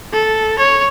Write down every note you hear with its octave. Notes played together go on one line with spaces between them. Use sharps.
A4
C#5